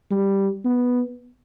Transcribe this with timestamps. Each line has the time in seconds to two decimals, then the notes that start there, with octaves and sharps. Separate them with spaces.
0.11 G3
0.65 B3